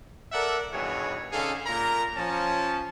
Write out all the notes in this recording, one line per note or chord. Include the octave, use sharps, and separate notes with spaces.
A4 A#4 D5 E5 F#5
G2 B2 D#3 E3 G#4 C#5
D3 C#4 D#4 G#4 A4 F5
A#2 A#4 A#5
F3 C#4 A5